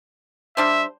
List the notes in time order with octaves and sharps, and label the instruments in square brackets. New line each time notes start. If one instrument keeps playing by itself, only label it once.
[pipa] G3 D4 C5 [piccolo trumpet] E5